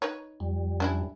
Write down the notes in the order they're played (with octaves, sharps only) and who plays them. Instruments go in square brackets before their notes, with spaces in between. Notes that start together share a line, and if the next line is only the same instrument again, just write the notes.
[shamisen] D#4 B4 C#5
[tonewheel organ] F2 G3
[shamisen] C#4 D4 E4